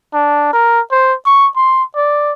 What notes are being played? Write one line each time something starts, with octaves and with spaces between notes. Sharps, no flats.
D4
A#4
C5
C#6
C6
D5